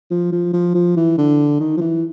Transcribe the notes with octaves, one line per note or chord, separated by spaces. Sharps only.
F3
F3
F3
F3
E3
D3
D#3
F3
E3